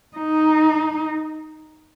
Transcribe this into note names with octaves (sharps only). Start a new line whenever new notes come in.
D#4